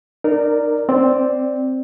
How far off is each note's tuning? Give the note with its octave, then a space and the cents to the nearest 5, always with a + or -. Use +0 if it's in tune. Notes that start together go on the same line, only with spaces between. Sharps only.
D#4 -25 A#4 -5 D5 +0
C4 +0 D5 +0